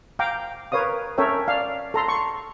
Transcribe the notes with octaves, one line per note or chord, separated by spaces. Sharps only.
F5 G5 A#5 D6
A#4 B4 C#5 F5 D#6
C#4 A4 A#4 C#5 E5 G5
D5 F5
A4 A#5 C6
C6 C#6